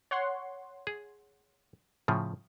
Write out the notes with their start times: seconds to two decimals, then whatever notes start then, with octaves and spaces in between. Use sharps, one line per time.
0.11 C#5 F#5 C6
0.87 G#4
2.08 A2 C#3 F3